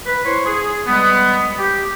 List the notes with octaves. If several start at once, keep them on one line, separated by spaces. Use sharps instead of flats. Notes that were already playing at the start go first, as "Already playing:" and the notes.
B4
E4 C5 C#5 C6
G#4
G3 G#3 B3
G4